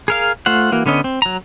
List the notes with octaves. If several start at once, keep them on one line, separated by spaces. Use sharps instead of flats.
G#4 A#4 F5
A3 F4 C5 F#5
E3 A#3 F#4
D3 B3 C#4 D#5
C4
F#3 A#5